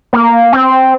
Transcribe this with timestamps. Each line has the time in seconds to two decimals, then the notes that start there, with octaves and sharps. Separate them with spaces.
0.13 A#3
0.53 C4